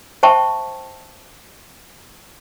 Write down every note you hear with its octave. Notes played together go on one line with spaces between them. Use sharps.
C5 E5 G5 A5 C#6